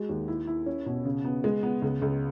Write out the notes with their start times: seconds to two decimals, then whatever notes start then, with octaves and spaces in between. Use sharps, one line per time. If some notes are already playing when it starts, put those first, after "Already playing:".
Already playing: G#3 F#4
0.09 D#2
0.28 E4
0.47 E4
0.66 C#4
0.86 B2
1.05 C#3
1.25 B3
1.44 G#3
1.63 B3
1.82 C#2
2.02 C#2